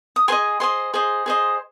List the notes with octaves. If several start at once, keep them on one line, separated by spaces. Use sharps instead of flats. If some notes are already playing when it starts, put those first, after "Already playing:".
D#6
G#4 C5 D#5 G#5 C6
G#4 C5 D#5 G#5 C6
G#4 C5 D#5
G#4 C5 D#5